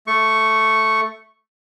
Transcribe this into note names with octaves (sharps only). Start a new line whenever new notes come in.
A3 C#6